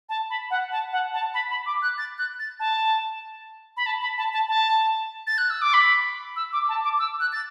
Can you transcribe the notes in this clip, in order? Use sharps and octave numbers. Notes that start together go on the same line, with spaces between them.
A5
B5
F#5
A5
F#5
A5
B5
B5
D6
F#6
A6
F#6
A6
A5
B5
A5
B5
A5
A5
A5
A6
F#6
E6
D6
B5
E6
D6
A5
D6
E6
F#6
A6